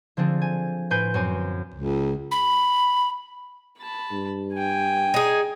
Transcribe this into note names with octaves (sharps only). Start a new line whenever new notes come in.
D3 F3 C4 D4 G#4 A4
G#5
A2 B4 C5 G#5 G6 D7
F#2 C4 C#5 G#5
C#2
B5
A5 B5
G2
G5 G#5
D#4 G#4